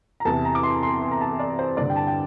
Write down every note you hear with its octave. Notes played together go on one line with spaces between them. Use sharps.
A#5
E2 C3 E3 A5
A#5
D6
C6
C6
C6
A#5
A5
D5
C5
G2 D3 D5
G5
A5
G5